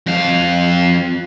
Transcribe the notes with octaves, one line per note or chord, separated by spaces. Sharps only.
F2 F5